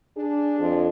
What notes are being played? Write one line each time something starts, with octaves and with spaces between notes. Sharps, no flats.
D4 G#4
F2